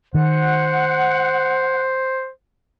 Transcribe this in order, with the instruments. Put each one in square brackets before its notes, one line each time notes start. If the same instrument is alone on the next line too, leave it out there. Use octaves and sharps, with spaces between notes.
[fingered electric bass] D#3 [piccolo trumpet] C5 [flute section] F#5 F#6